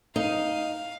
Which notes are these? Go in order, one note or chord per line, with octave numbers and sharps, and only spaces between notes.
D#4 F5